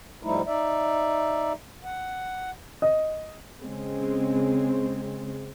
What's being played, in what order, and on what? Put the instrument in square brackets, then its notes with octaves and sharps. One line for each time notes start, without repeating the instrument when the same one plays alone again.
[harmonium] G#2 F3 G3 A3 D#4 E4
D#4 D5 E5
F#5
[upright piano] D#5
[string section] C#3 G#3 C4